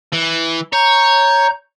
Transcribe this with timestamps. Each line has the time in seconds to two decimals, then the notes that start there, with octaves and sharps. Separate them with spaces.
0.13 E3
0.73 C#5 A#5 G6